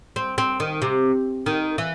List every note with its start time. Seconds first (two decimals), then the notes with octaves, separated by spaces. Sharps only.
0.16 C4
0.38 C4
0.60 D#3
0.82 C3
1.46 D#3
1.78 E3